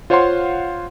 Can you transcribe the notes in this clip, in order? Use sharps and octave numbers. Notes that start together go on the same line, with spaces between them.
F4 C5 C#5 F5 F#5 C6